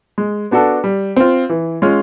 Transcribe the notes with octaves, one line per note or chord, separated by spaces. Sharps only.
G#3
B3 D4 F#4 A4
G3
C4 F4
E3
G#3 C#4 F4